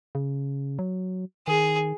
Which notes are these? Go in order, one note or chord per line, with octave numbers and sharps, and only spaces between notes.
C#3
F#3
D#3 G#4